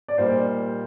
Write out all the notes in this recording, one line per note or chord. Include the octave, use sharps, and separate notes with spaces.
D5
A#2 G3 A#3 D#4 G4 C5